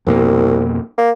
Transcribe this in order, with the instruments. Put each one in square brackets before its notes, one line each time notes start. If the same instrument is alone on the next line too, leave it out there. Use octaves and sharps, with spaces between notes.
[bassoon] C2 [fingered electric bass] F2 B2 A#3
[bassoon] A#3